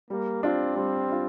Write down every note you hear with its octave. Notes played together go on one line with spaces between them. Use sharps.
G3 A#3
C4 D4 F4
G3 C4
D4 F4